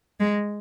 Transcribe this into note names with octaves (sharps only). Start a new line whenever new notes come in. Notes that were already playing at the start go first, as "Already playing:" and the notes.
G#3